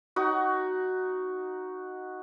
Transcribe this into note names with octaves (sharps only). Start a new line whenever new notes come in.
D#4 F#4